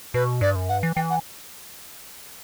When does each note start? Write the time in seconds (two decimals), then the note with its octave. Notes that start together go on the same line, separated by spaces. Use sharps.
0.14 B2 B4
0.41 G2 D5
0.56 F#2
0.69 G2 F#5
0.83 E3
0.96 E3 G5
1.10 F#5